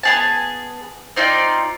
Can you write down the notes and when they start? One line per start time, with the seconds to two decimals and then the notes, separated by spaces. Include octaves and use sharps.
0.03 B3 G#4 A5
1.16 C4 D#4 F4 D5